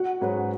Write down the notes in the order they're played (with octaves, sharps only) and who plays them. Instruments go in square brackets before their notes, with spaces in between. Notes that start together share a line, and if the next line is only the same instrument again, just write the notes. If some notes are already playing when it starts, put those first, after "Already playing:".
Already playing: [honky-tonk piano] F#4 F#5
[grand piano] G#2 F#3 C#4 G#4 B4